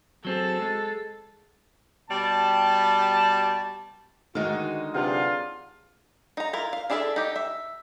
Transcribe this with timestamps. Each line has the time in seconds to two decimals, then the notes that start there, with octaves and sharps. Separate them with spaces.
0.25 F#3 C4 G#4 A4
0.60 G#3
2.10 B2 G3 G4 A5
4.35 D3 D#3 G#3 D#4 F#4 F6
4.94 C3 F#3 D4 F4 G#4 B4 F#5
6.37 D#4 A#5
6.53 E4 F4 A#4
6.73 F5
6.90 D4 E4 G#4 A4 E5
7.16 D#4 G4
7.36 E5